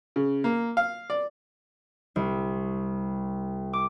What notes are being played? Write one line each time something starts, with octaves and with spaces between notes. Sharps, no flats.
C#3
A#3
F5
D5
C2
D6